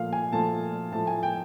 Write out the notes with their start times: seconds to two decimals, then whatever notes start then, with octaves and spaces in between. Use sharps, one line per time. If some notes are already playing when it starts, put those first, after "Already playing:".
Already playing: A#2 F3 A3 F5
0.13 G#5
0.33 A#2 F3 A3 A5
0.92 A2 F3 A3 A5
1.07 G#5
1.23 G5